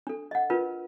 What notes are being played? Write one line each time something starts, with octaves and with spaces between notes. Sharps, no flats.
D4 A4
D#5 F#5
D4 F4 A#4 B4